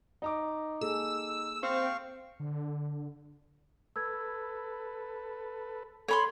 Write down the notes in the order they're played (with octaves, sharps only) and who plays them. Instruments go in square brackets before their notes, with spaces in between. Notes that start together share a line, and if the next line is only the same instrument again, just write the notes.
[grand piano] D#4 A#5 D6
[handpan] A#3 G#4 A4 [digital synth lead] E6
[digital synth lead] C4 [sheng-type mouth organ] F5 C#6
[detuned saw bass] D3
[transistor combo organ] A4 B4 [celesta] E6 G#6
[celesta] A4 [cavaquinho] C#5 B5 C6